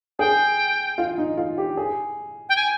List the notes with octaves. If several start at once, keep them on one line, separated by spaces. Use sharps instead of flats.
G#4 G5
F4
D#4
F4
G4
G#4
G5
G#5